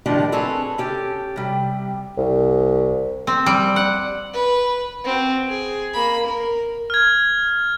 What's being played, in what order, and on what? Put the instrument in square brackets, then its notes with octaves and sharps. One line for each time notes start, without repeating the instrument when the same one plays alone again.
[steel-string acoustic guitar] A2 D3 D#3 F3 D4 G4
C4 G#4 A4 B4 C#5
C#4 G4 A4
C3 G3
[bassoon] C2
[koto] C4
G3
F#5
[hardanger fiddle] B4
C4 F#4
G#4
A#3 B5
A#4
[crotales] F6 G#6